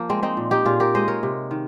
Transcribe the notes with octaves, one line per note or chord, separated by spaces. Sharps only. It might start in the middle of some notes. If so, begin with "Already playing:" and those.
Already playing: F3 A#3
G#3 C4
C4 D#4
A#2
D#4 G4
A#2 F4 G#4
G4 A#4
G#3 C5 D#5
A#4 C#5
C3
D#3